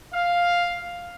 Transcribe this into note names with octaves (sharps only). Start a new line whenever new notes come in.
F5